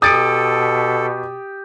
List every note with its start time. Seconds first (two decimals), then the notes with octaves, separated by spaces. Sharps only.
0.02 B2 G4 A4 D#6 A6 D7